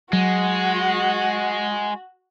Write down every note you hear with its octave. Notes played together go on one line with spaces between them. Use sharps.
F#3 G#3 F#4